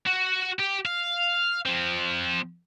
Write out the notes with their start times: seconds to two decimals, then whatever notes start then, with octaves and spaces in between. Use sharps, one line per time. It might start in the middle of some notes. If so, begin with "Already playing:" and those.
0.07 F#4
0.60 G4
0.85 F5
1.65 F3 C4